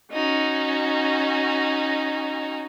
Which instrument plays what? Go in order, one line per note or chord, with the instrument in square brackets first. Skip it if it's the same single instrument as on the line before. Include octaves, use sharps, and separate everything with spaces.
[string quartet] C#4 D#4 F#4